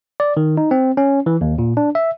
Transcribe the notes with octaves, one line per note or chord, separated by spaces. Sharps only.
D5
D#3
D#4
C4
C#4
E3
D#2
A#2
D4
E5